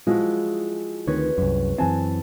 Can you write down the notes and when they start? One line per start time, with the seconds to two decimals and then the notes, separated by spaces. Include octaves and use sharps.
0.07 F3 G#3 E4 F#4
1.07 D2 D#3 C4 B4 C#5
1.38 C2 F#2
1.78 F#2 E3 C4 G#5 A5